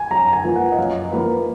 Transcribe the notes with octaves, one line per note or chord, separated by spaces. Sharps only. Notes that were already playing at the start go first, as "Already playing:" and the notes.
Already playing: G#5
F#2 A#5
G#5
F3 A#3 F4 B4
F#5
D#5
F#2 F5
F3 A#3 F4 B4